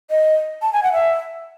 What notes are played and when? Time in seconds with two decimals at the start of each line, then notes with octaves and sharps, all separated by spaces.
0.11 D#5
0.62 A5
0.73 G#5
0.83 F#5
0.93 E5